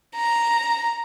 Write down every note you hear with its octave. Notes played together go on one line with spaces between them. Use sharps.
A#5